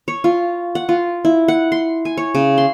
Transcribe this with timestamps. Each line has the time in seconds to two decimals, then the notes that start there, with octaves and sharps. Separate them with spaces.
0.08 C#5
0.24 F4
0.75 F#5
0.89 F4
1.25 E4
1.48 F#5
1.72 C6
2.05 G#5
2.17 C#5
2.35 C#3
2.58 C6